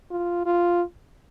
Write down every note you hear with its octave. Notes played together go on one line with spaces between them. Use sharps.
F4
F4